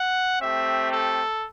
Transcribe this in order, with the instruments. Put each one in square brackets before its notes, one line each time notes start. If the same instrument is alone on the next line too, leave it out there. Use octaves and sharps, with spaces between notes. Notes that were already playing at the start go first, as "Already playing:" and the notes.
Already playing: [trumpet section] F#5
A3 C4 G4 E5
A4